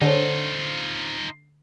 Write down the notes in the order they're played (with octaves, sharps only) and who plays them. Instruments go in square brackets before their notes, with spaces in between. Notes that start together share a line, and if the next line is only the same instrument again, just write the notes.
[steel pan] D3 [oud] C4 C5 C#5 [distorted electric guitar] D#4 F4